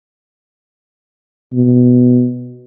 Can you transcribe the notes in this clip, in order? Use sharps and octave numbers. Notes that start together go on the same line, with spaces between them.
B2